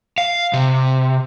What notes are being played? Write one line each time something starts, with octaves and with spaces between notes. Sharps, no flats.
F5
C3